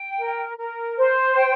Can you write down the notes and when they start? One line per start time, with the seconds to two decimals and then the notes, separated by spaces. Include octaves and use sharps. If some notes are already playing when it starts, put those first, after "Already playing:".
Already playing: G5
0.18 A#4
0.59 A#4
0.97 C5
1.37 G5